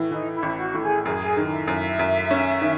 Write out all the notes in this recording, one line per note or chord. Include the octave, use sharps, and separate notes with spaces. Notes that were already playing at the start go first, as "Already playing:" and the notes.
Already playing: A2 E3
E3 D#4
E4
A1
F#4
A2
G#4
F#2 G#4
D#3
E5
F#2 E5
F#2
C#4
D#3